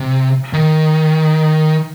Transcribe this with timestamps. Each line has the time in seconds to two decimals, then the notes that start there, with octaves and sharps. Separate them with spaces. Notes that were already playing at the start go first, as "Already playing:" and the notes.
Already playing: C3
0.53 D#3